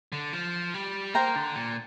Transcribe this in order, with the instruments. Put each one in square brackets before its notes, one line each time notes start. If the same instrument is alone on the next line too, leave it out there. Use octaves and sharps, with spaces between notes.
[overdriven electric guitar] D3
F3
G3
[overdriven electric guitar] A#3 [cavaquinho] C5 G5 A#5
[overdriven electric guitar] D3
A#2